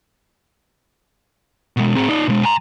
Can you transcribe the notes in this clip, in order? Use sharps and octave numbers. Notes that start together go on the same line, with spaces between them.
B2 G#3
C4 G#4
D#4 D5
B2 G#3
G#5 A#5